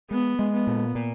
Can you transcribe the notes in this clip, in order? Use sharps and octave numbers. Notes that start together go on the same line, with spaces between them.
G#3 B3
G#3
B3
A#2
A#2